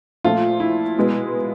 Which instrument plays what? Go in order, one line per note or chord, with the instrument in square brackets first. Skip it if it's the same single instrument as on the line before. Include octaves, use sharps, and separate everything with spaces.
[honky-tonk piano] A#2 F3 A3 [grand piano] F4
[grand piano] E4
[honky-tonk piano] B2 G#3 B3